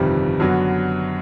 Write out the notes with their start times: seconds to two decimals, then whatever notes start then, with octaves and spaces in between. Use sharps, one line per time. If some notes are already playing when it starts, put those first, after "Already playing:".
Already playing: G1 F2 C3 D#3 G3
0.40 F#2 D3 F#3 B3